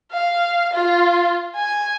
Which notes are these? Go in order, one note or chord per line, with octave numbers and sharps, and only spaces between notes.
F5
F4
G#5